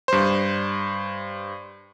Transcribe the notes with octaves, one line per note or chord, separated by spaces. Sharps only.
G2 C5